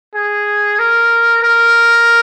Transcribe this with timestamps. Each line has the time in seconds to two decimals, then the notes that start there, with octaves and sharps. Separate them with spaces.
0.15 G#4
0.79 A#4
1.43 A#4